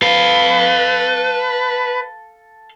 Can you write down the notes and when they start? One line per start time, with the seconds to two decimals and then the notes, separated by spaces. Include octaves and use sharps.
0.02 A4 B4 F5